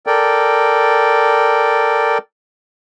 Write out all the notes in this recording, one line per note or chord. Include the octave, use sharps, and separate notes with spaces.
A4 A#4 D5 G5